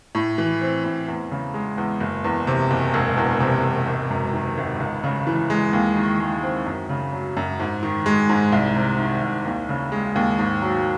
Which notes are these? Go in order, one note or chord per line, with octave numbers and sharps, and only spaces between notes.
A2
E3
C4
A2
E2
C#3
G#3
E2
F#1
E2
C3
F#1
E1
E2
C3
E1
G#1
F#2
D#3
G#1
C#2
C#3
E3
G#3
D#2
D#3
G#3
C4
F#2
C#3
F#3
F#2
G#2
D#3
G#3
G#2
C2
C3
D#3
C2
D#2
C#3
G#3
D#2
G#2
F#3